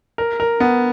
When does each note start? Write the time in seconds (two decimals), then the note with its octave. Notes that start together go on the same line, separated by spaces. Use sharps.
0.18 A#4
0.40 A#4
0.60 B3